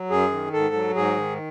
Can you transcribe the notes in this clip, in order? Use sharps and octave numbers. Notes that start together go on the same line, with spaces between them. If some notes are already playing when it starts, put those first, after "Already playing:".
Already playing: F#3
F#2 G#4
D#3
G#2 A4
F#3
G#2 G#4
D#3